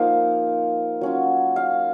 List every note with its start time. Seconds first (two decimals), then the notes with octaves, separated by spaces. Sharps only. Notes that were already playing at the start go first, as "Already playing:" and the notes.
Already playing: F3 A#3 D#4 F5
1.01 F#3 C#4 F4
1.56 F5